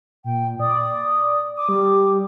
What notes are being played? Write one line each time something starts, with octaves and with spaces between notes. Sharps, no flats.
A#2 G5
D5 D#6
D6 D#6
G3